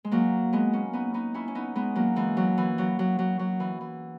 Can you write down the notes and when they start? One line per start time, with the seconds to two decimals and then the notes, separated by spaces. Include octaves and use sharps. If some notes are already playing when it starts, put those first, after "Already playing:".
0.04 G#3
0.11 F#3 A#3
0.53 G#3 B3
0.73 A#3 C#4
0.93 B3 D#4
1.14 B3 D#4
1.34 C#4 E4
1.48 C#4
1.55 B3 D#4
1.75 G#3 B3
1.96 F#3 A#3
2.16 E3 G#3
2.37 F#3
2.58 E3
2.78 F#3
2.99 F#3
3.19 F#3
3.39 F#3
3.60 E3
3.81 E3